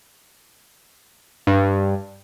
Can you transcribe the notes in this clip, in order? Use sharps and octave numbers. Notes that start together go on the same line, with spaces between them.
G2